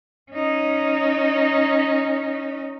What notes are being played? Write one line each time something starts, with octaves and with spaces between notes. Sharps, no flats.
C#4 D#4